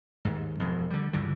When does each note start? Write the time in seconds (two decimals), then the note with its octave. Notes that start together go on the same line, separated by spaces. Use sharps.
0.25 D#2 G#2
0.60 E1 F2
0.90 D3 G3
1.13 C#2 G2 D3 E3